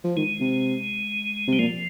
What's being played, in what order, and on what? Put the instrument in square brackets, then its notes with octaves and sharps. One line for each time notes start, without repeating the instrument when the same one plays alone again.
[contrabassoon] F3
[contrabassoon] D#3 [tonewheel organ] G#3
[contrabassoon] C3
C3
[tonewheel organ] G3
[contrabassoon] A#2 [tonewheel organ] F3